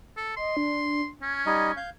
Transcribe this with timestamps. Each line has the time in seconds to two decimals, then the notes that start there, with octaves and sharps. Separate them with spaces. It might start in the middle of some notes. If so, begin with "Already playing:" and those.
0.17 A4
0.37 D#5 C6
0.57 D4
1.22 C#4 G#6
1.46 G3 D#4 D#5
1.77 F5 G6